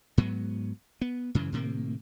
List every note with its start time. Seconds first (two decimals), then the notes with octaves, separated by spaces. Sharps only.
0.18 G#2 F#3 B3
1.01 B3
1.35 F#2 C#3 E3
1.52 A2 C3 D#3 A#3